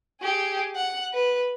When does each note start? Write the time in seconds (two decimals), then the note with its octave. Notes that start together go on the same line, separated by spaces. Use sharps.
0.21 G4 G#4
0.75 F#5
1.13 B4